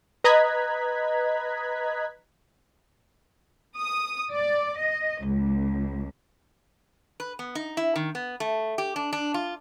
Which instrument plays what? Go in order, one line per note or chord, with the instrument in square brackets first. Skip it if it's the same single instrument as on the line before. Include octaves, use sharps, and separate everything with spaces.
[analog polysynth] B4 D#5 A#5 F#6 G#6 B6
[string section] D#6
D5
D#5
C#2
[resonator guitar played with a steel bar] B4
B3
D#4
E4
D#3
B3
A3
G4
D4
D4
F4